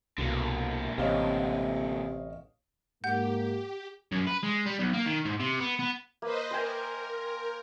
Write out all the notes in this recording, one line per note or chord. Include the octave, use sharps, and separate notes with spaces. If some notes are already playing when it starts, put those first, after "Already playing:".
C2 B2 D3 A#3
A1 C3 C#5 D#5 F5
G#2 A#3 G4 F#5 G6
F#2
B4
G#3
G3
B1
A#3
D#3
G#2
C3
B3
B3
A#3 B4 C5 D#5
A#4 C5 G5 G#5